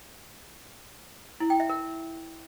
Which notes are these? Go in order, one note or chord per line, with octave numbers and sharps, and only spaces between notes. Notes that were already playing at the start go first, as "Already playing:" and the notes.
E4
G5
E5
A#4